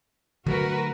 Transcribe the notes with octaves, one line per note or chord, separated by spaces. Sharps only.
D3 F#3 A3 F#4 A#4 B4